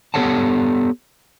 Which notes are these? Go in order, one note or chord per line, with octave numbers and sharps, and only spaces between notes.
B3 G4 A4 C#5 F#5 A5